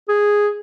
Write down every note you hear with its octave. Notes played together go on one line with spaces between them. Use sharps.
G#4